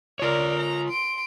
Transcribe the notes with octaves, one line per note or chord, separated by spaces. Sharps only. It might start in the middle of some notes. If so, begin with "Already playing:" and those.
F4 A#4 C#5 D5
A#5
C6 D7